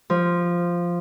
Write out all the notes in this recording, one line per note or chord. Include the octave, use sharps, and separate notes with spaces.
F3